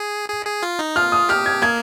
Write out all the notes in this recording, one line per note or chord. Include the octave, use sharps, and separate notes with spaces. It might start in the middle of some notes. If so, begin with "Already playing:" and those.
Already playing: G#4
G#4
G#4
F4
D#4
F4 F6
D#6
G4 F6
G#6
A#3 G#6